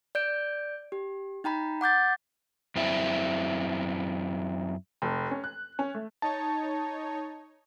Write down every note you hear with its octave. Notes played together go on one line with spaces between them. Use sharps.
D5 G6 D7
G4
D#4 G5 A#5 B5
F#5 D6 G6 A6
F#2 C4 E4
F1
C#4
F#6
C#4
A3
D#4 C#5 A5